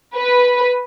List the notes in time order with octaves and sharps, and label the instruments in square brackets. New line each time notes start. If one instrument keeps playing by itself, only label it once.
[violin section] B4